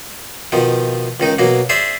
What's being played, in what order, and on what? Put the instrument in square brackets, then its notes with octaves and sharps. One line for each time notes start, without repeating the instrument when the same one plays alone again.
[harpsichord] B2 D#3 F3
C#2 D#3 D#4
B2 F#3 A#3
G#4 C5 D5 E5